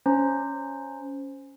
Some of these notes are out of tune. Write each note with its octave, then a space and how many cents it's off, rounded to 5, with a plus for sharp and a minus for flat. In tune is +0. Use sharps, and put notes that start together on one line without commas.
C#4 +0 C5 +0 A#5 -20